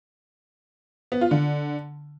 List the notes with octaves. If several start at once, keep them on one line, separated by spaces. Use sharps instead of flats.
B3
F4
D3